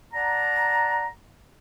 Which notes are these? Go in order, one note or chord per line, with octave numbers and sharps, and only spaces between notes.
D5 F#5 A5 A#5